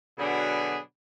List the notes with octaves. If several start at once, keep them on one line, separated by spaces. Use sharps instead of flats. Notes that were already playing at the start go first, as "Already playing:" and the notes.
B2 D3 F#3 D4 G#4 B5